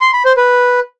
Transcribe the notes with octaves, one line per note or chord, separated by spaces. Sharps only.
C6
B5
C5
B4